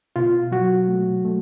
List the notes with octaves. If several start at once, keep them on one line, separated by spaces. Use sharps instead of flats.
B2 F4
F#3 F#4
A3
A3